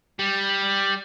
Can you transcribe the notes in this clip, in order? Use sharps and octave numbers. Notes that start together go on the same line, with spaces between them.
G3